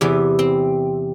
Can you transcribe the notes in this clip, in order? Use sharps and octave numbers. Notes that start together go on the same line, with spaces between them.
E2 C3 E3 B3
C4